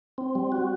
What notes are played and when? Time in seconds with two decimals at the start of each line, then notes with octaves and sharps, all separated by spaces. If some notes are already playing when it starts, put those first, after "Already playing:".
0.18 C4
0.35 G3
0.52 F#4